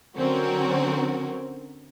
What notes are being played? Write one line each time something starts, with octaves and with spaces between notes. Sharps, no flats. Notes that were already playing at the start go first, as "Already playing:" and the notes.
D3 F#3 C4 C#4 F#4 A#4